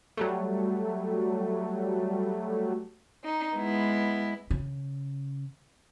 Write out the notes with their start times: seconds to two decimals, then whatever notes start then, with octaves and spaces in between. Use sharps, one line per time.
0.17 F#3 G3 A3
3.24 D#4
3.56 G#3 B3 E4
4.50 C#3